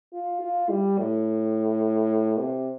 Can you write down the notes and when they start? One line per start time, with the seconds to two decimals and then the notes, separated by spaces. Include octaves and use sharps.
0.13 F4
0.41 F4
0.70 G3
0.99 A2
2.39 C3